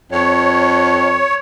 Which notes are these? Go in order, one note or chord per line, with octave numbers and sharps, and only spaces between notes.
F2 C#5